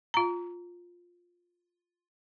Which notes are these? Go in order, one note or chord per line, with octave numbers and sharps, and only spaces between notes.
F4 A#5